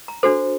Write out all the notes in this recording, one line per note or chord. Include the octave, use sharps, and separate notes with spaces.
A#5
D4 F#4 A4 C5